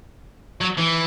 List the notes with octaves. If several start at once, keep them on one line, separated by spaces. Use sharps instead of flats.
F#3
E3